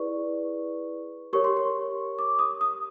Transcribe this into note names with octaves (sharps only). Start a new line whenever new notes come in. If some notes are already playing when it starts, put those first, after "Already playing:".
Already playing: E4 G#4 B4 D5 C#6
G4 A#4 C#5 C#6
C6
C#6
D6
D#6
D#6